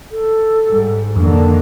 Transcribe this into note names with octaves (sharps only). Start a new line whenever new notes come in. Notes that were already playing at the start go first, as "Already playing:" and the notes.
A4
G#2 G3
F2 D3 D#3 A#3 D4